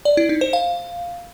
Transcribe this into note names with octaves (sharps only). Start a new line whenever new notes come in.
D5
E4
D#4
C5
F5